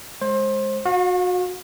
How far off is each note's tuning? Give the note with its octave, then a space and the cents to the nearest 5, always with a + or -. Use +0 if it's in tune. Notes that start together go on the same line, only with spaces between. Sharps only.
G#3 +0 C5 +25
F#4 -30 F5 +35